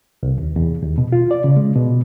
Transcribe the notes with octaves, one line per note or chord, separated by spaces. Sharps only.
C2
D#2
E2
D#2
B2
F4
D5
C#3
G#3
B2